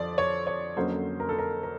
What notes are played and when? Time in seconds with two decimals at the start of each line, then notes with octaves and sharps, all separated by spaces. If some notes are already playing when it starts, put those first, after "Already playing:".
Already playing: F2 F3 D5
0.18 C#5
0.47 C#5
0.76 F2 D3 F#3 A#3 C#4 C5
1.20 A#4
1.29 A4
1.39 A#4
1.63 A#4